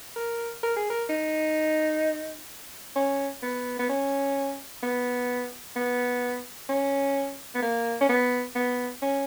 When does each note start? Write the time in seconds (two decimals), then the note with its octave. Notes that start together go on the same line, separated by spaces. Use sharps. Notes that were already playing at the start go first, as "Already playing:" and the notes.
0.16 A#4
0.63 A#4
0.76 G#4
0.90 A#4
1.09 D#4
2.96 C#4
3.43 B3
3.79 B3
3.89 C#4
4.83 B3
5.76 B3
6.69 C#4
7.55 B3
7.62 A#3
8.01 C#4
8.09 B3
8.56 B3
9.02 C#4